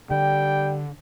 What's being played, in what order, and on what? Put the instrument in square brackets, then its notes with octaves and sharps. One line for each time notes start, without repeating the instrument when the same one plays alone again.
[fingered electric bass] D3 [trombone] G3 [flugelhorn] G5